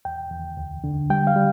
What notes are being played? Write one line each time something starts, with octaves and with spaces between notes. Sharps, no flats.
E2 G5
E2
D2
D3
G3 G5
F5
G3